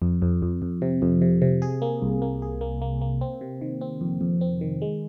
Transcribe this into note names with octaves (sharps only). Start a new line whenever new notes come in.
F2
F2
F2
F2
C3
F2
C3
C3
G#4
A#3
C2
A#3
G#4
A#3
A#3
A#3
C4
C3
D#3
C4
F2
F2
C4
D#3
G#3